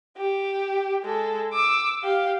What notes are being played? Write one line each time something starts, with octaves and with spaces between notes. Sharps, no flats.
G4
G#3 A4
D6 E6
G4 F5